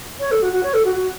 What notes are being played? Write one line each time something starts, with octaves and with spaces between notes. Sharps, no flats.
C#5
A4
F#4
F#4
C#5
A4
F#4
F#4